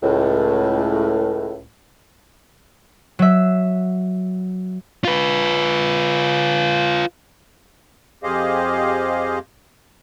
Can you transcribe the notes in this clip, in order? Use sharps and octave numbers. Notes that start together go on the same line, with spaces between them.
C#2 A2
F#3 E5
F4 B4
F2 G4 G#4 C5 D#5 F5